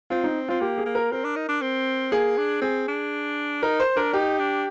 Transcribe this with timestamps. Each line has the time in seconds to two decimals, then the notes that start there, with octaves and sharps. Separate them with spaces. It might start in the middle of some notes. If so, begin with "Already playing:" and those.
0.10 C4 F4
0.24 D#4
0.49 C4 F4
0.61 A#3 G4
0.78 G#4
0.86 A#3
0.95 A#4
1.11 C4 A#4
1.25 D4
1.36 D#4
1.49 D4
1.62 C4
2.12 A#3 G#4
2.38 D4
2.62 C4 G#4
2.88 D4
3.63 D#4 A#4
3.80 C5
3.97 D4 A#4
4.13 D#4 G4
4.39 D4